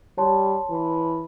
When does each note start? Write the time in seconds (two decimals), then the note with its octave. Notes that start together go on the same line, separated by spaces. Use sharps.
0.18 G3 C#5 A5 C6
0.70 E3